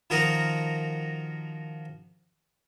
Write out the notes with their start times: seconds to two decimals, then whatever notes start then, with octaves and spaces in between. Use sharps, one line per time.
0.10 D#3 F3 F#4 A#4 D#5 A#5